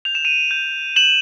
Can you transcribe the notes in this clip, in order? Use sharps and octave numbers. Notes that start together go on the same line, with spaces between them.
G6 F7
E7
D#7 F7
G6
G6 E7 F#7